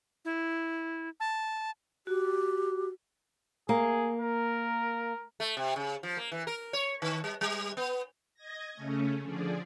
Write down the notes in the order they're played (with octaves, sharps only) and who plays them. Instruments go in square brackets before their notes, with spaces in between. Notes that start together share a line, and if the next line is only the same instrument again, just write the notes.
[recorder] E4
A5
[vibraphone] F#4 [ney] G4
[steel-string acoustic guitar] A#3 [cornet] G#4
[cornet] A#4
[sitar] A3
C3
C#3
F3
A#3
E3
A#4
C#5
D#3
G3
G3
B3
[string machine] D#5 G#6 A#6
C#3 A3 C#4
D3 F3 G#4 D5